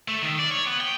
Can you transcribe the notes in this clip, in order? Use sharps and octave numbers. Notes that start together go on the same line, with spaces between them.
A3
D#3
D5
C#5
B3
G5